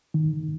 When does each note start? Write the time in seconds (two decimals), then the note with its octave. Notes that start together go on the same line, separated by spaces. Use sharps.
0.14 D#3